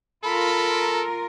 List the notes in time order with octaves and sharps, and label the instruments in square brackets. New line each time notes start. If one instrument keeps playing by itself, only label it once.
[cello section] F4 A#4 [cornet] A4 [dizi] B5